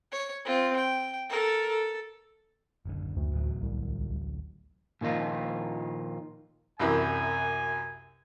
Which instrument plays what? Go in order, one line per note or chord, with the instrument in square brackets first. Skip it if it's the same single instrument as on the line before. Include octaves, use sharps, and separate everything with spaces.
[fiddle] C#5
C4 F4
G5
A4 A#4
A4
[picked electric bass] F#1 B1 D3
[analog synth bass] D2
[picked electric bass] D1 A1 F#3
[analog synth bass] C2
[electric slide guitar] A#2 D#3 F3 D#4 F4
[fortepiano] C2 F#2 E3 [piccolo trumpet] G#5